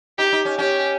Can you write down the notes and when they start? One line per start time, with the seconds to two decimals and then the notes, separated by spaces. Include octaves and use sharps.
0.18 D#4 G4
0.32 D#4
0.45 C#4
0.58 C#4 G4